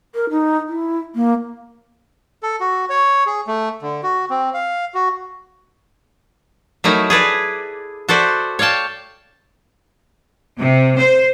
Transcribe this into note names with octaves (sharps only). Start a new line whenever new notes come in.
A#4
D#4
E4
A#3
A4
F#4
C#5
G#4
A3
D3
F#4
C4
F5
F#4
F#3 A3 D#4 E4 A#4
G#4 A4 B4 D5
F#4 A4 C5 D5 E5
C#5 D5 F5 G5 A5
C3
C5